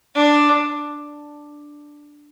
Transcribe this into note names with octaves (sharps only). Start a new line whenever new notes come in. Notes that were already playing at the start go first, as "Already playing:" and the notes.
D4